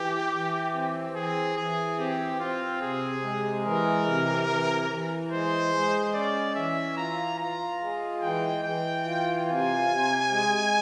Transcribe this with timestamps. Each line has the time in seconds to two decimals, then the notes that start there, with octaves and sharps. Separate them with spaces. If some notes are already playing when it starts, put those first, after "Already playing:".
Already playing: E3 G4
0.33 E3
0.74 C4
1.15 E3 G#4
1.57 E3 G#4
1.98 C4 G4
2.40 C4 F4
2.82 C3 G#4
3.23 G#3
3.64 E3 A#4
4.06 C3
4.48 E3
4.89 E3
5.31 G#3 C5
5.73 G#3
6.14 C#4 D5
6.55 E3 E5
6.97 F4 A#5
7.38 F4 A#5
7.80 G#3
8.21 E3 G5
8.63 E3 G5
9.05 F4
9.46 C3 G#5
9.88 C3
10.30 G#3